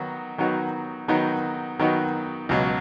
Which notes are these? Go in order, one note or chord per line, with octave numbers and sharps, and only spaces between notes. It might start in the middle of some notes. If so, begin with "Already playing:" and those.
Already playing: D#3 F#3 B3 D#4 F#4
D#3 F#3 B3 D#4 F#4
D#3 F#3 B3 D#4 F#4
D#3 F#3 B3 D#4 F#4
C#2 B2 F#3